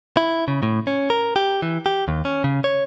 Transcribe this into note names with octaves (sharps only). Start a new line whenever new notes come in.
E4
C#3
A2
C#4
A#4
G4
E3
G4
D#2
C#4
C#3
C#5